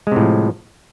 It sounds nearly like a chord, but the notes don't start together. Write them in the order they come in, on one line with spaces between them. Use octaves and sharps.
G#3 C3 A2 F3